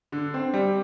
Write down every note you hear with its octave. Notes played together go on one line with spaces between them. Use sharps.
D3
C4
G3